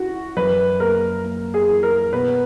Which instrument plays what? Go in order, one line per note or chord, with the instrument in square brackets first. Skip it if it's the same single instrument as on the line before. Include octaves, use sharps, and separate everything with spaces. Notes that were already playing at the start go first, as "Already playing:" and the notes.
Already playing: [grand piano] C#4 E4 [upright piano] F#4
[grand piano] F#2 [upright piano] B4
[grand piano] A#3 [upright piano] A#4
[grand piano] A#3
[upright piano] G#4
[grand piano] E3
[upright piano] A#4
[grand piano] B2 [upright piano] B4